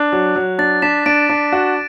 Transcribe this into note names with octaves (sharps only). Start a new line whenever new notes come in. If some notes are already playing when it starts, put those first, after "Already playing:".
Already playing: D4 F#6
F#3
F#3
D4 A6
D4 B6 E7
D4 A6 D7
D4
F#4 B6